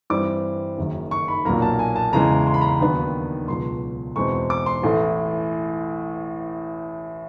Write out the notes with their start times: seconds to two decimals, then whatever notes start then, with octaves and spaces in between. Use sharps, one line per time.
0.10 G2 E3 G3 C4 D6
0.78 F#1 F#2 D#3 F#3
1.11 C#6
1.28 B5
1.45 B1 A#2 F#3 A#3 A#5
1.62 A5
1.79 G#5
1.96 A5
2.13 E1 E2 C#3 E3 G#3 A#5
2.47 C6
2.54 B5
2.61 A#5
2.68 B5
2.80 D#2 D#3 F#3 B3 D4
3.48 C#2 B2 F#3 C6
4.16 E2 B2 G#3 C4 C#6
4.50 D6
4.66 C6
4.83 A1 A2 E3 A3